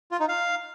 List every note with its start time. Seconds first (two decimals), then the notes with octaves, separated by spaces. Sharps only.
0.11 F4
0.20 D#4
0.29 F5